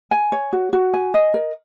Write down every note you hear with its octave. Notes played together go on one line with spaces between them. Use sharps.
G#5
C#5
F#4
F#4
G#5
D#5
A#4